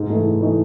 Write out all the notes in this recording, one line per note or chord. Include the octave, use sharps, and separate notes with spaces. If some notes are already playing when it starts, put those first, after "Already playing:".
Already playing: G#2
E3 A3 D#4
G#2
E3 A3 D#4